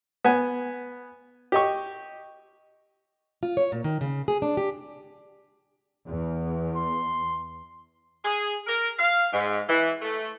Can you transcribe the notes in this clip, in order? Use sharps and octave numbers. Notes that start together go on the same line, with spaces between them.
B3 G#5
G4 D#5 C#6
F4
C#5
A#2
D#3
C#3
G#4
D4
G4
E2
C6
G#4
A#4
F5
G#2
E3
A3